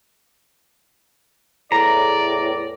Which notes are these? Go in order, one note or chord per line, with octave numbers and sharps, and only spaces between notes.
E2 A2 D5 A#5